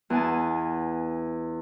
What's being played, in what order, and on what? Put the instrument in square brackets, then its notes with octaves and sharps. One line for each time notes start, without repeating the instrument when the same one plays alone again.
[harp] E2 B4 G#5 A5